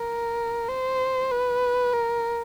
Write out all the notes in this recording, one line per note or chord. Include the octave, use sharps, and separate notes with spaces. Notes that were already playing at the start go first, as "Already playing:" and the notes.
Already playing: A#4
C5
B4
A#4